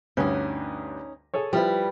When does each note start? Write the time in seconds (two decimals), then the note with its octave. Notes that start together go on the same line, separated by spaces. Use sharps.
0.17 D2 G2 C#4 D#4
1.34 G#4 A4 C#5
1.53 F3 G3 E4 B4